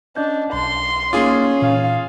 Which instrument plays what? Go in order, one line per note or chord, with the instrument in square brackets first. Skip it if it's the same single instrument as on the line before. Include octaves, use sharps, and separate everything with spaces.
[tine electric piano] C#4 D#5 G6 [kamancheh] D4
[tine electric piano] B1 [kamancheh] C6
[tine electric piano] A#3 D#4 D6 [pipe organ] C#4 [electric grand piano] F4 G#4
[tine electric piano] A#2 E3 [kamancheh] F5